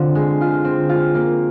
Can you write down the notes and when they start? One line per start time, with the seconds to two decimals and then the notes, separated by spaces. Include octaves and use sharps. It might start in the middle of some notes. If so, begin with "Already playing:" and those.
Already playing: D3 C4 F4
0.15 G#3
0.41 F4
0.65 C4
0.89 F4
1.14 A#3